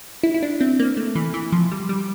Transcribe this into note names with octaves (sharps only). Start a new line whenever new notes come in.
E4
E4
D4
C4
A#3
A3
E3
E3
F3
G3
G3